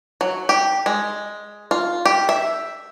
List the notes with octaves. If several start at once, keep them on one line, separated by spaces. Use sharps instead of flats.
F#3
G4
G#3
F4
G4
E5